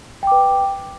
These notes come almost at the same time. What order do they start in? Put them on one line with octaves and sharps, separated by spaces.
G5 D6 B4